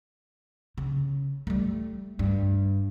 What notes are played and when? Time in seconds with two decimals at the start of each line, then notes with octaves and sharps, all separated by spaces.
0.78 C#3
1.47 G3 A3
2.19 G2